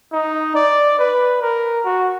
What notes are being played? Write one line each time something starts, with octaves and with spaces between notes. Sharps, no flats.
D#4
D5
B4
A#4
F#4